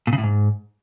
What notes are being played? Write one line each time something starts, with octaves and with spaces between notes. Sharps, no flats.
A#2
C#3
A2
G#2